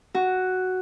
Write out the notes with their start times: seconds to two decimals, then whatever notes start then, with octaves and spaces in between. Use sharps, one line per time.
0.14 F#4